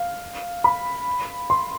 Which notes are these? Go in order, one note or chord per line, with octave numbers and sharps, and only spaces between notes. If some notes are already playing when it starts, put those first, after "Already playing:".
Already playing: F5
B5
C6